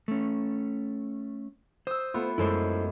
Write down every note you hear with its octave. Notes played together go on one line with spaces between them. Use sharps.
A3 C#4
C5 D#6 E6
A3 B3 F4
F#2 G#3 A3 E4 A4 C5